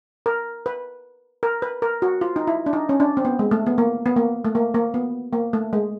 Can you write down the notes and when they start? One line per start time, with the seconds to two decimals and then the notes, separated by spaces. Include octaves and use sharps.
0.26 A#4
0.66 B4
1.43 A#4
1.62 B4
1.82 A#4
2.02 F#4
2.21 F4
2.36 D#4
2.47 E4
2.66 D4
2.73 D#4
2.89 C#4
3.00 D4
3.17 C4
3.25 B3
3.39 G#3
3.51 A3
3.66 B3
3.78 A#3
4.06 B3
4.16 A#3
4.45 A3
4.55 A#3
4.74 A#3
4.94 B3
5.33 A#3
5.53 A3
5.73 G#3